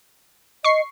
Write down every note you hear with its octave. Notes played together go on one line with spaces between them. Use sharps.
D#5 C#6 C7